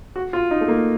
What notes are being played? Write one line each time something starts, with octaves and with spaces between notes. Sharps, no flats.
F#4
F4
D#4
A3
A#3